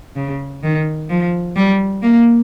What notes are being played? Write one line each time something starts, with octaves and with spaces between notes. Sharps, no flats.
C#3
D#3
F3
G3
A#3